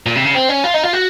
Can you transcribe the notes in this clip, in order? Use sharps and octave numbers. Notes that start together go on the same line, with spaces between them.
A#2
C3
C#3
C4
C#4
F4
D#4
F4
F#4